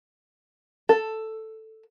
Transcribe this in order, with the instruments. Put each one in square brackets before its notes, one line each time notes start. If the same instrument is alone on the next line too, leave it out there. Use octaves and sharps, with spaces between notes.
[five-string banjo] A4